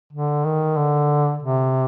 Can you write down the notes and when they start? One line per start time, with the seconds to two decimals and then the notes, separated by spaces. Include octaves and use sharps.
0.13 D3
0.45 D#3
0.77 D3
1.43 C3